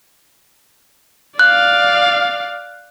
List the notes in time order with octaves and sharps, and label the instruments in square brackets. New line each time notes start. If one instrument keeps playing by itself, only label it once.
[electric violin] D5 F5 [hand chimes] F#6